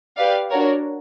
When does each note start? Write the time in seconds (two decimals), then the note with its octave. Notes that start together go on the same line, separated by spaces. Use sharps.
0.17 G4 B4 D5 F5
0.51 D4 F#4 A#4 C#5